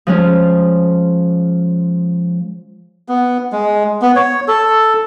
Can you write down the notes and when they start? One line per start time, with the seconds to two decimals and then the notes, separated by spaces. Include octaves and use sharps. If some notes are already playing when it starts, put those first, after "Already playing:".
0.07 F3 G#3 C#4
3.08 B3
3.52 G#3
4.02 B3
4.16 C#5
4.48 A4